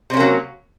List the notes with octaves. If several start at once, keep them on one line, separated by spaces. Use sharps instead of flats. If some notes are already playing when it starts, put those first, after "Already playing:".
C3 F#3 A#3 C#4